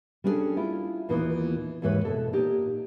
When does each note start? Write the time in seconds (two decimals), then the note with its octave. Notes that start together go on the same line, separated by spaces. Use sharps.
0.24 G3 C#4 D4 F#4 G#4 A4
0.57 E4 F4
1.09 D#2 A#2 E3 B3 D4 D#4
1.82 D#2 G#2 E3 B4 C#5
2.05 B2 A4
2.33 A#2 D#4 G4